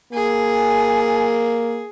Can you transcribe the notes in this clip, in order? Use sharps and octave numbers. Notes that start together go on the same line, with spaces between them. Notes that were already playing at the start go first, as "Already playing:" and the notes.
A#3 G#4 G#5